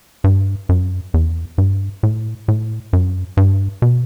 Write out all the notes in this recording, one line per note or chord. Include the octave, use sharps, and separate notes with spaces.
G2
F#2
E2
G2
A2
A2
F#2
G2
B2